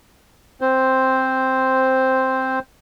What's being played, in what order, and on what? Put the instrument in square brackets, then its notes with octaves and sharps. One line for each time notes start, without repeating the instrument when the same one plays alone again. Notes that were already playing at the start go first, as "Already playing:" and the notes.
[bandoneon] C4 C5